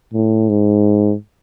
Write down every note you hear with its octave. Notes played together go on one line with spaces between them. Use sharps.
A2
G#2